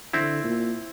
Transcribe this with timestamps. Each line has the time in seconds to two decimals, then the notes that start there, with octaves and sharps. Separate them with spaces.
0.13 D3 C4 E4
0.44 A#2